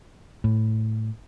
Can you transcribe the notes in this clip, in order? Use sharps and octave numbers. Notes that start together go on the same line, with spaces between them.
A2